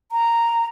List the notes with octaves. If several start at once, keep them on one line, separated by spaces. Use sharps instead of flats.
A#5